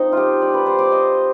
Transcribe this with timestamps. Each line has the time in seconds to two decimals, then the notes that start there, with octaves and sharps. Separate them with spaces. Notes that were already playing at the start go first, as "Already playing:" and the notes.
Already playing: F3 C4 D#4
0.12 F4 G4
0.42 D5
0.54 B4
0.66 C5
0.79 D5
0.92 D#5